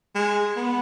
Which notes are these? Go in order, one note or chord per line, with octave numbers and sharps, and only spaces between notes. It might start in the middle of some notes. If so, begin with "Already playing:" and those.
G#3
B3